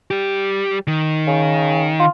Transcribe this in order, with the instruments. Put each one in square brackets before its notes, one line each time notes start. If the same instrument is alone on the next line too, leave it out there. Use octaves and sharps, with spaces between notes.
[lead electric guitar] G3 G4
D#3
[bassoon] C#3
F4